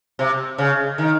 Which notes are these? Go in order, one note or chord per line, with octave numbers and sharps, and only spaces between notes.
C3
C#3
D#3